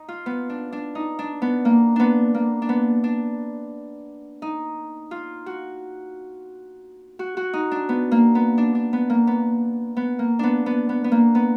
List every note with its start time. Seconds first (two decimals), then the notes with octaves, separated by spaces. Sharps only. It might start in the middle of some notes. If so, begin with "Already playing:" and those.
Already playing: D#4
0.08 F4
0.26 B3
0.50 D4
0.72 D4
0.95 D#4
1.19 D4
1.42 B3
1.65 A#3
1.96 B3 D4
2.34 A#3
2.62 D4
2.69 B3
3.04 D4
4.42 D#4
5.11 F4
5.46 F#4
7.19 F#4
7.37 F#4
7.53 D#4
7.71 D4
7.89 B3
8.11 A#3
8.35 B3
8.58 D4
8.75 D4
8.93 B3
9.10 A#3
9.27 B3
9.97 B3
10.19 A#3
10.39 B3 D4
10.66 B3
10.89 B3
11.04 B3
11.12 A#3
11.35 B3